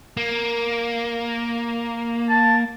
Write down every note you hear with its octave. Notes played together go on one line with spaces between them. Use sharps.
A#3
A5